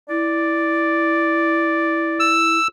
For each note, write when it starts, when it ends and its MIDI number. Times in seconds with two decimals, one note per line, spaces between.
0.09 2.58 64
0.09 2.36 74
2.20 2.68 88